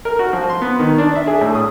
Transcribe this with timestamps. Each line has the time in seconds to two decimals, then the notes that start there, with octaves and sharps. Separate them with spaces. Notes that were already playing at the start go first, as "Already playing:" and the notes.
0.05 A#4
0.19 F#4
0.33 F3
0.50 C6
0.62 B3
0.79 D#3
0.98 D4
1.15 E5
1.27 G#4
1.41 A2
1.55 D#6